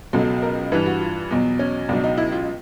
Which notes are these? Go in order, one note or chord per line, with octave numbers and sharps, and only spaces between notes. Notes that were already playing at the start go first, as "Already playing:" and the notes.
C#2 B2 F#3 A4
A#4
G2 E3 B4
F#4
F4
E2 B2 F#3
C#4
C#2 B2 F#3 D4
D#4
E4
F4